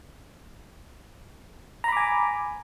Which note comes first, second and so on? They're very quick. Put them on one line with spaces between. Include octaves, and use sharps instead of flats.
A#5 B5 D6 G#5